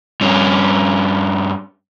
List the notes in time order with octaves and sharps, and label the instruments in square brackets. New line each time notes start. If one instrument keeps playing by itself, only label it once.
[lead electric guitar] G2 C#4